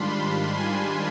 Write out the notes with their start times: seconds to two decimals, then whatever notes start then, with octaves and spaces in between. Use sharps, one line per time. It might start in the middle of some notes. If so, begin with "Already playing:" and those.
Already playing: G#2 D#3 G3 D4 F4 B5 C6
0.12 B5
0.57 G#5